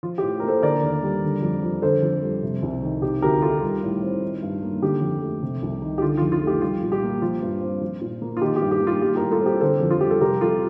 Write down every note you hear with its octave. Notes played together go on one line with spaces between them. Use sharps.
F3 F4
A2 G4
A#4
A#3 A4 C5
D3 A#4 D5
D#2
G3
D3
F2
F3
D3 A4 C5
F2
G3
C3
C2
D#3
C3 G4
D2 G4 A#4
D#3 F4 A4
G3
A2
C4
D#3
G2
A#3
D3 G4
F2
A3
C3
C2
D#3
G4
D3 F4
F2 F4
F4
A3
G4
G3 F4
A#2
G4
A#3
F3 F4
G2
C4
F3
A#2
A#3
F4
D#3 G4
G4
G2
G4
A#3
F4
G3 G4
A2 G4 A#4
F4 A4
C4 G4
D3 A4 C5
F2
F4
G3 G4
A4
C3 G4 A#4
F2 F4 A4